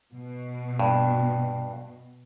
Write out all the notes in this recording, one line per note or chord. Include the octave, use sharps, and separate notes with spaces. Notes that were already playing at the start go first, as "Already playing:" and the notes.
B2
G2